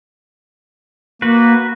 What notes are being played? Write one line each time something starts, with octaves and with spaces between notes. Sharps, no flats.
A#3 F#4 B4